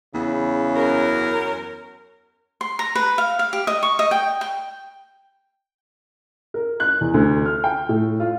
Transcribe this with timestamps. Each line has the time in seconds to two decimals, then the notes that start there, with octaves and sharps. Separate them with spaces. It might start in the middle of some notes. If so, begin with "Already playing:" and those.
0.14 E2 C#3
0.76 F#2 C#4 A#4
2.61 C6
2.79 A#5
2.95 B4
3.18 F5
3.39 F5
3.53 G4
3.67 D#5
3.83 C#6
3.99 D#5
4.11 G5
4.41 G5
6.54 A#4
6.80 F#6
7.01 E2
7.14 D2
7.46 F6
7.64 G5
7.89 A2
8.20 F4